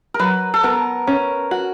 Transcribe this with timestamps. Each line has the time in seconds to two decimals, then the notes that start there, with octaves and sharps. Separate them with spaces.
0.14 A#4
0.19 F#3 B4
0.54 A4
0.63 B3 A#4
1.07 C#4
1.51 F#4